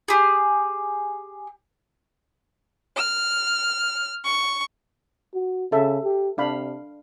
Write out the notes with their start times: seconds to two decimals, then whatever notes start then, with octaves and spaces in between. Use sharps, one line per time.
0.08 G4 G#4
2.97 F6
4.23 C#6
5.34 F#4
5.72 C#3 A4 E5
6.04 G4
6.38 C3 D4 F5 B5